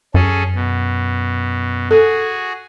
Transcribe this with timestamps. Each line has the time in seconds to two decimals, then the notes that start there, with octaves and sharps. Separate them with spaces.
0.14 F#2 C#4 G#4 A4
0.55 B2
1.91 F#4 G#4 A4